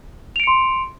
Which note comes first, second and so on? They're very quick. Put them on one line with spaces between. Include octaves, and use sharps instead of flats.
F7 D7 C#7 C6